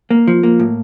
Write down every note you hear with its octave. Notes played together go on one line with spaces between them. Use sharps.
A#3
F3
A#3
A2